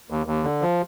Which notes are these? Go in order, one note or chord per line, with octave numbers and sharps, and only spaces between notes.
D#2
D#2
D3
F3